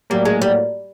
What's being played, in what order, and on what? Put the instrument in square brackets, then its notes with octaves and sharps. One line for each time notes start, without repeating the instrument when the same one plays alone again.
[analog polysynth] A2 F#3 A#3 [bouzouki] G3
[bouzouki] G#3
G3